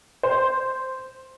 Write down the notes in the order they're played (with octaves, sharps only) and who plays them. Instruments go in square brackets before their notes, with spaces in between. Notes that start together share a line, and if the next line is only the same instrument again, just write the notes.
[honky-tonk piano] C5